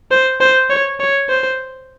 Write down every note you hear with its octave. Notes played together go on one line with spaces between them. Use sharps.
C5
C5
C#5
C#5
C5